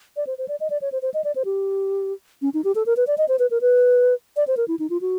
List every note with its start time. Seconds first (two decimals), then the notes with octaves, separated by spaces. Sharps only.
0.17 D5
0.27 C5
0.38 C5
0.48 D5
0.60 D#5
0.70 D5
0.82 C#5
0.92 C5
1.02 C5
1.14 D#5
1.24 D5
1.36 C5
1.45 G4
2.42 C#4
2.54 D#4
2.64 G4
2.75 A4
2.86 A#4
2.97 B4
3.07 D5
3.18 D#5
3.29 C5
3.39 B4
3.51 A#4
3.61 B4
4.36 D5
4.47 C5
4.57 A#4
4.68 E4
4.79 D#4
4.90 F4
5.01 F#4